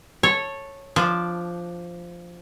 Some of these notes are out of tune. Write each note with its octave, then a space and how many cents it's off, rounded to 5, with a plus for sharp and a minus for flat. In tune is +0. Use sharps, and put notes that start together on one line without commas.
A4 +0 C#5 -10
F3 -5 D4 +0